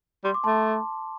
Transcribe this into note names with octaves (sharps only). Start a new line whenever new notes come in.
G3 C6
D6
A3 A5 C6